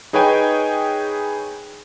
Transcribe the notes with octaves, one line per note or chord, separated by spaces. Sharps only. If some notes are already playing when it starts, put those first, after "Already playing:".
D#4 G#4 B4 C#5 G5 G#5